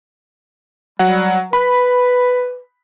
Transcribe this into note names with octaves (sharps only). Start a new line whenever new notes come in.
F#3 G3 F#5
B4 B5